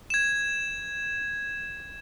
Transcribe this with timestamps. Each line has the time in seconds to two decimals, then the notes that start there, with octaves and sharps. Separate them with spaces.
0.10 G#6 E7